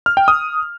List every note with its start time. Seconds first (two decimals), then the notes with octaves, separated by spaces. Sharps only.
0.06 F6
0.17 G5
0.28 D#6